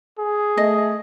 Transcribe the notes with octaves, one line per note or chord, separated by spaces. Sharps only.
G#4
A3 D#5